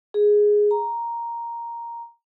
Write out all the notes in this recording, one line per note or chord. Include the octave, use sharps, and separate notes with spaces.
G#4
A#5